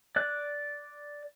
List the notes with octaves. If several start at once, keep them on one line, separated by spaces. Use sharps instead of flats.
D5 F#6